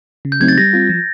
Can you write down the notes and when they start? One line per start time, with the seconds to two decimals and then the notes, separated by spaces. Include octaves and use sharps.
0.25 C#3
0.32 G6
0.40 F#3 A3 C4 D#4 G#6
0.48 A6
0.57 G3 A#6
0.73 C4 F4
0.89 F3